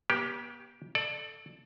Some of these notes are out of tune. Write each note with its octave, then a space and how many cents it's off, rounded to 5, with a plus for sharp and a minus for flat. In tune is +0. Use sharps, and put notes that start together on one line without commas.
B3 -45 G4 +0
A4 +0 D5 +25